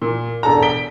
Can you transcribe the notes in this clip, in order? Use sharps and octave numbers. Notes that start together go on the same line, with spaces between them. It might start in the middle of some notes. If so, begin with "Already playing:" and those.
A#2
E1 D4 A4 A#5
B6 D7 G7